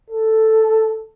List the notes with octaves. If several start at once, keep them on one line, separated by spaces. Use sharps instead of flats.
A4